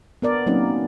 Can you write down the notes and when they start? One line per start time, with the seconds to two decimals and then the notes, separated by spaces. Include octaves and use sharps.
0.22 B3 A#4 D5
0.46 F#3 A#3 C4 C#4 D#4